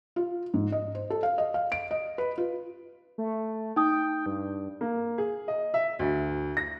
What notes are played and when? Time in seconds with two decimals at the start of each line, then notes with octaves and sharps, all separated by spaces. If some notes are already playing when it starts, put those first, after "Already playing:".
0.16 F4
0.54 G#2
0.72 D#5
0.95 C5
1.10 A4
1.23 F5
1.38 D#5
1.54 F5
1.72 D7
1.91 D#5
2.18 B4
2.38 F4
3.18 A3
3.76 D#4 G5 D#6
4.26 G2
4.81 A#3
5.18 G#4
5.48 D#5
5.74 E5
5.99 D2
6.57 A#6